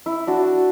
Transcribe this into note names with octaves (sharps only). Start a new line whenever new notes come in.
E4
D4 F#4